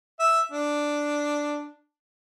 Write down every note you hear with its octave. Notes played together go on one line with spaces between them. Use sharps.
E5
D4